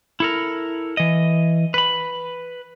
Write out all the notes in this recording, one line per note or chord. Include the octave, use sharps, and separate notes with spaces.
E4 A4 A#4
E3 D#5
B4 B5